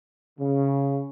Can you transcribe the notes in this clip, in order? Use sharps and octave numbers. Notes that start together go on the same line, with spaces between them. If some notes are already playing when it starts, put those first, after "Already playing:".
C#3